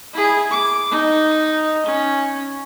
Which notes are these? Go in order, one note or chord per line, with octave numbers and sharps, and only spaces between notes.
E4 G#4
D6
D#4
C#4